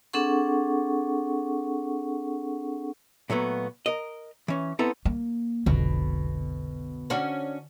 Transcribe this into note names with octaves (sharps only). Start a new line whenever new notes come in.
C4 D4 G#4 A4 F#5 C#6
A#2 F#3 A3 B3
A#4 D#5
E3 C#4
B3 C4 E4 A4 A5 A#5
A#3
F1 B1 F2 B2 D3
C#4 D4 F#4